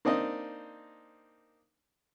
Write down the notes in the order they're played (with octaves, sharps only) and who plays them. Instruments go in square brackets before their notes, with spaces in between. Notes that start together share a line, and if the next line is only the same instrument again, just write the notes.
[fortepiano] A#3 C4 D4 D#4 D#5